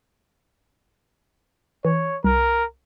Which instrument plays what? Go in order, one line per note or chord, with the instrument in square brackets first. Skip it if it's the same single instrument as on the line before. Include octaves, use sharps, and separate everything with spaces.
[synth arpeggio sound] E3 [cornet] C#5
[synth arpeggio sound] C2 [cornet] A#4